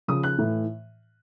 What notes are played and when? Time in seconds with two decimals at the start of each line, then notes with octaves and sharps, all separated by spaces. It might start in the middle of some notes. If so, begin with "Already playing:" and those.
0.08 C#3 F3 D#6
0.23 F#6
0.38 A2 E3